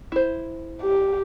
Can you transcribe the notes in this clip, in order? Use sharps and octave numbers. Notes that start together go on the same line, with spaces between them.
E4 C5
G4